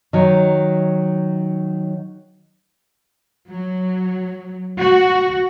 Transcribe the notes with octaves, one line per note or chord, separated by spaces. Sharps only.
D#3 F#3
F#3
F#4